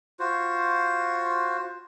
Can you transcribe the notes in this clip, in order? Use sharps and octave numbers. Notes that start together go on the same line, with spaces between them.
F4 F#4 C5